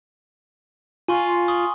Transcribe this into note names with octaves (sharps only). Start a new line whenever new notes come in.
F4 G#5 C6 C#6
C6 C#6 D#6